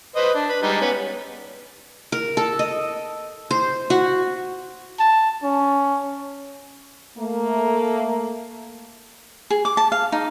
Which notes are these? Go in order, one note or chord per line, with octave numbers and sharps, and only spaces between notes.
B4 C5 D#5
D4
B4
G3 G#3 D#4
B3 C#4
A#4
A4
D#5
C5
F#4
A5
C#4
A3 A#3
G#4
D6
A5
F5
D#4